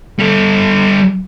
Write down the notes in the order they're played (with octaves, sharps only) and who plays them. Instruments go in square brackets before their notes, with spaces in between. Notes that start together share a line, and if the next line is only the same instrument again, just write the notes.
[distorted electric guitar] G3 A4